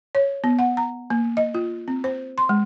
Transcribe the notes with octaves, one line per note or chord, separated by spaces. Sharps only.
C#5
B3
F#5
A#5
A#3
D#5
F4
C4
C5
C6
G#3